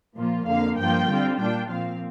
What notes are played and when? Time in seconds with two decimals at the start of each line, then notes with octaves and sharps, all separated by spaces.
0.16 A#2 F3 A#3 F4
0.46 F2 D3 A#3 F5
0.77 G2 F3 A#3 F4 G5
1.09 D3 G3 C4 F4
1.39 A#2 G3 D4 F4 G5
1.70 A#2 F3 C4 F5